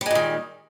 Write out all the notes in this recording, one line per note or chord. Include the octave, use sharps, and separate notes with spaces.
A#2 D#3 G3 G#3